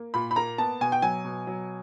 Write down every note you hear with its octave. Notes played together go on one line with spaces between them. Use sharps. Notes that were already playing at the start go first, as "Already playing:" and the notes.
Already playing: A#3
A#2 B5
B5
A#3 A#5
B3 A5
B2 G#5
G5
F#3 G#5
B2
F#3